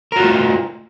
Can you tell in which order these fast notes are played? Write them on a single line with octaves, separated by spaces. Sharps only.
A#4 F#4 F4 A3